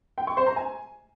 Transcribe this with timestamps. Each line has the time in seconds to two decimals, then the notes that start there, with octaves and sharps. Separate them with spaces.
0.18 G5
0.27 C#6
0.37 C5
0.47 A#5
0.56 G#5